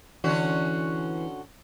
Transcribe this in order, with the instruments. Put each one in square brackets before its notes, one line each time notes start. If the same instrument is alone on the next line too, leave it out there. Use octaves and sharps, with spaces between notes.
[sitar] D3 C#4 F#4 [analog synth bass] E3